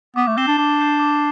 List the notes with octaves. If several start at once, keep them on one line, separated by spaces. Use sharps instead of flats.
B3 D6
A3
C4 G6 C7 E7 G7
D4
D4 D6
G6 C7 E7 G7
D6